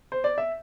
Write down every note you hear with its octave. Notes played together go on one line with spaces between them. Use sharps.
C5
D5
E5